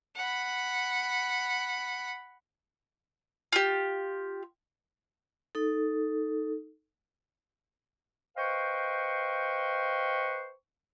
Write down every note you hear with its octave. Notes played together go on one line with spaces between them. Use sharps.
F#5 B5
F4 G4
D#4 A4
B4 C5 D#5 F5 G5 C#6